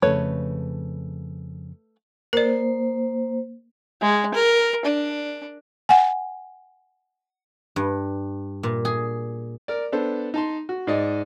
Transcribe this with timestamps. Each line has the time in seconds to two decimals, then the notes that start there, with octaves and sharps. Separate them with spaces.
0.02 F2 A2 C#3 A3 B4 C#5
2.33 A#3 A#4 C5 D5
4.01 G#3
4.34 A#4
4.85 D4
5.89 F#5 G#5
7.76 G2
8.63 A#2
8.85 G#4
9.68 A#4 D5
9.92 B3 D4 A4 C5
10.34 D#4 A5 C6
10.69 F#4
10.87 G#2 D5 D#5